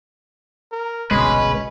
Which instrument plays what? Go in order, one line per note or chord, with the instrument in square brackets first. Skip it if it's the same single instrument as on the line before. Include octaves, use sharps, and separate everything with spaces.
[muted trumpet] A#4
[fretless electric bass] G1 C2 B2 [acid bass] G#3 [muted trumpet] C#4 [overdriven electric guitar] B4